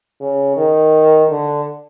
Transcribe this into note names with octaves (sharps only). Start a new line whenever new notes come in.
C#3
D#3
D3